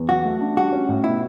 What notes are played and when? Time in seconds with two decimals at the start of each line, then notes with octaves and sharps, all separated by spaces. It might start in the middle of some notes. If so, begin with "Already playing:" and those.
Already playing: E2
0.09 F#3 F#4
0.25 A3
0.40 D4
0.57 G3 F#4
0.72 C#4
0.89 A2
1.04 B2 E4